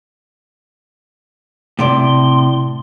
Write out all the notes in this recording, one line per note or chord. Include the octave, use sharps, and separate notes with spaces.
A2 C3 D5 C6